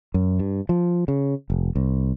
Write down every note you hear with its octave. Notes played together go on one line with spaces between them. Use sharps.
F#2
G2
F3
C#3
F1
C2